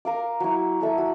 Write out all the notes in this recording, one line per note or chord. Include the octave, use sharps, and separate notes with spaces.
A#4 F5 D6
F#3 E4
F#4 A4 E5
F#4